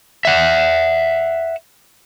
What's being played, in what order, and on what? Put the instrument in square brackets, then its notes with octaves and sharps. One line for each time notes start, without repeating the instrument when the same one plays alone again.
[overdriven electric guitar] E5 F#5